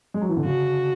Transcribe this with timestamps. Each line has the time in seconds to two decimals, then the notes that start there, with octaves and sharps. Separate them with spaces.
0.14 G#3
0.21 F#3
0.29 E3
0.37 D3
0.44 C#3 F#4